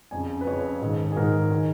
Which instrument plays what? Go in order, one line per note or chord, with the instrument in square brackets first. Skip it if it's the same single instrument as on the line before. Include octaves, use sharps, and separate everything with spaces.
[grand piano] F2 C#3 G#5
B4
F2 C#3 C#5
G#2 D#3
G#4
G#2 D#3 A#4
D#3